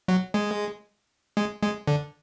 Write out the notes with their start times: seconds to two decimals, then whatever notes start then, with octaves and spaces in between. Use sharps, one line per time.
0.08 F#3
0.34 G#3
1.37 G#3
1.62 G#3
1.87 D3